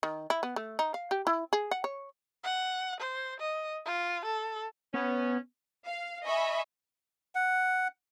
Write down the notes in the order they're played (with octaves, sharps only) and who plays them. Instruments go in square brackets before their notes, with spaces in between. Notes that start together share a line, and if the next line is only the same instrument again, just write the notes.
[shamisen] D#3
E4
B3
A3
D#4
F5
G4
E4
G#4
F#5
C#5
[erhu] F#5
C5
D#5
F4
A4
[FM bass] B3 [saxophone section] C#4
[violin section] F5
D#5 E5 G#5 B5 C#6
[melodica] F#5